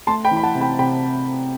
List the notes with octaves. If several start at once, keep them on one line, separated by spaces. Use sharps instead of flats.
A3 A5 C6
G5 B5
E3
B5
F#5 A5
C3
G5 B5
C3 G5 B5